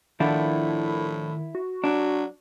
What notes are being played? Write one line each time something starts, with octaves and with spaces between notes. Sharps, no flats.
A2 D#3 F3 D4 E4 F#5
F#4
F#3 D4